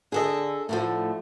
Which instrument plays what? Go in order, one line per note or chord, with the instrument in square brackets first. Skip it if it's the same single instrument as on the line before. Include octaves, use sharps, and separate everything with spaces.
[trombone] D3 [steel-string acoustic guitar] G#4 A4 D#5
[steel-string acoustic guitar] A2 D3 F3 [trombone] A3